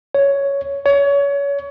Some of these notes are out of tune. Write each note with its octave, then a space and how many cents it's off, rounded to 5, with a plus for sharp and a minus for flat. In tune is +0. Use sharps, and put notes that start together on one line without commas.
C#5 +5
C#5 +25